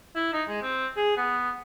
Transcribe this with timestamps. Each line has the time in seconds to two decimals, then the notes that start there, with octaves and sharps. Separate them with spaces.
0.16 E4
0.33 D#4
0.48 G#3
0.62 C4
0.97 G#4
1.17 B3